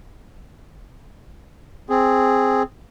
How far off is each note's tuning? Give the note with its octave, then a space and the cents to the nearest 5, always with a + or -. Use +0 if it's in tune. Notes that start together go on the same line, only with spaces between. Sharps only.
C4 +0 G#4 +0